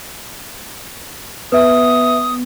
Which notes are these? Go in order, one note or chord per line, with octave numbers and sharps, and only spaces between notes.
B3 B4 E5 D#6